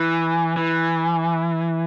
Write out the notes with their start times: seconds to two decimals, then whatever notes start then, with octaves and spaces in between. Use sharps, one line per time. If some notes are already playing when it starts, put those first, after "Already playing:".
Already playing: E3
0.57 E3